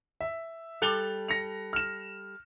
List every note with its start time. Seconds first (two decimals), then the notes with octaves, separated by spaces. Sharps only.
0.21 E5
0.82 G3 A4 F#6 F7 G7
1.28 A#6 C#7 F7
1.73 F6 E7